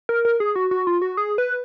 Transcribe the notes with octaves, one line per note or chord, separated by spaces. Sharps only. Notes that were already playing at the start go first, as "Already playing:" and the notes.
A#4
A#4
G#4
F#4
F#4
F4
F#4
G#4
B4